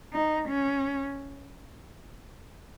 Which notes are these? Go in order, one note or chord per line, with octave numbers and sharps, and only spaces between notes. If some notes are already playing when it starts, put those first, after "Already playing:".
D#4
C#4